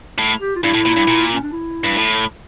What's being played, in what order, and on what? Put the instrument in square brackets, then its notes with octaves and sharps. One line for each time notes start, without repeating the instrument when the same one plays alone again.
[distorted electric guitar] A2
[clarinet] G4
F4
[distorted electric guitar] G2 [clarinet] E4
[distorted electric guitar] A2
A#2
G2
A#2
[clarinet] C#4
D4
E4
[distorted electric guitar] G2
A2